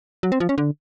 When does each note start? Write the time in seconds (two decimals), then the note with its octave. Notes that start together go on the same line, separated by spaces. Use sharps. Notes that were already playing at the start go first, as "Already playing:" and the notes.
0.23 F#3
0.32 C4
0.40 F3
0.49 C#4
0.58 D3